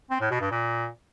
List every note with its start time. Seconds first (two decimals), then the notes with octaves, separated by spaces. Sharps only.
0.11 C4
0.21 A2
0.31 B2
0.41 G2
0.51 A#2